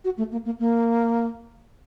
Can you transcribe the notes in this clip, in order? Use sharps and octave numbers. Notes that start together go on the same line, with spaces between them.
F#4
A3
A#3
A#3
A#3